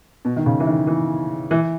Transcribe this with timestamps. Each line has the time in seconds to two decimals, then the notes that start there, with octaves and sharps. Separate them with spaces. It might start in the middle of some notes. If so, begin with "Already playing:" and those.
0.25 B2
0.36 D#3
0.46 C#3
0.60 E3
0.66 D#3
0.87 E3
1.51 E3